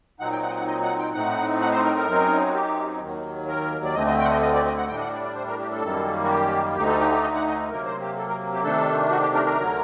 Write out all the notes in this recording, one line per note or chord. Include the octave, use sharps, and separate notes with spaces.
A#2 F#3 C4 D#4 F#5
G5
F#5
D#5
F#5
D#5
F#5
G5
A2 A3 C4 D#4 F#5
F#5
C5
A#4
A#4
F#2 F#3 C4 D#4
F#4
G4
D#2 D#3 F#3
A#4
D5
D2 D3 A3 C4 D#5
D#5
G5
F#5
D#5
D#5
D5
D#5
F#5
A2 G3 D4 G5
D#5
F#5
D5
D5
C5
A#4
G4
A4
F#2 D#3 G3 A#3
F#4
G4
D2 D3 A3 D#4 G4
A4
G4
G4
D#5
F#5
D#5
C3 F#3 A#3 A#4
C5
G4
A4
A#4
G4
C3 D#3 A3 D4 A4
F#4
G4
A#4
A#4
D2 D3 F#3